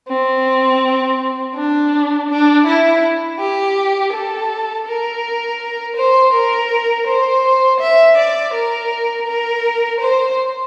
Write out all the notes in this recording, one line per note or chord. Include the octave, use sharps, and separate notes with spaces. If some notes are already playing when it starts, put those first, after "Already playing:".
C4
D4
D4
E4
G4
A4
A#4
C5
A#4
C5
E5
D5
A#4
A#4
C5